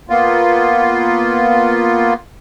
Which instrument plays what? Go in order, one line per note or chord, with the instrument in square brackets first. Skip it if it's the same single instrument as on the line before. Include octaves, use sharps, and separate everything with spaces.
[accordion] A#3 B3 F4